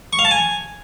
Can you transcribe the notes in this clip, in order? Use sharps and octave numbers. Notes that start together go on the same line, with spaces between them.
C#6
F5
A5
G#5